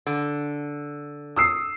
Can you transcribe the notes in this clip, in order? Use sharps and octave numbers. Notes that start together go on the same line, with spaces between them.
D3
D#6 E6 C7